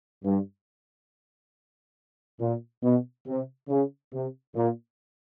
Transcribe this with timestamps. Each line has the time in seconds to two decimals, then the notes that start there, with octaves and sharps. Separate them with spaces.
0.24 G2
2.39 A#2
2.82 B2
3.26 C3
3.69 C#3
4.12 C3
4.55 A#2